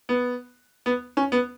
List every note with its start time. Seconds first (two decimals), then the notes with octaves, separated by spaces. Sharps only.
0.09 B3
0.86 B3
1.17 C#4
1.32 B3